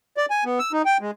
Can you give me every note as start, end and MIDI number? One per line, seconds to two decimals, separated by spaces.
0.17 0.26 74
0.30 0.44 80
0.45 0.59 59
0.59 0.72 88
0.73 0.82 63
0.85 0.97 79
1.01 1.11 56